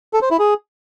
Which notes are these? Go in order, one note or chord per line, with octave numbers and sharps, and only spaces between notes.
A4
C5
E4
G#4